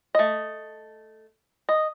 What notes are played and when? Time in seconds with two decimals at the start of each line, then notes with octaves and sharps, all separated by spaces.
0.15 A3 D#5
1.69 D#5